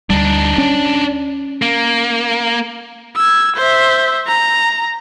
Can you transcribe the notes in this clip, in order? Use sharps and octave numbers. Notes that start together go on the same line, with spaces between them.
D2 G3 D4 D#4
C#4
A#3
E6 G#6
C5 E5
A#5